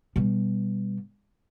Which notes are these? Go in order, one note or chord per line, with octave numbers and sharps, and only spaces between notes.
B2 G3